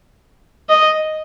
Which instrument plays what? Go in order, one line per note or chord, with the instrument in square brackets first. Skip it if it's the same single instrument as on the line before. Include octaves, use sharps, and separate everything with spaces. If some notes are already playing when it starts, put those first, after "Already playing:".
[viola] D#5